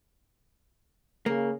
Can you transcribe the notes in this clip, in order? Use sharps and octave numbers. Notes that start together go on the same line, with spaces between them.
C#3 A#3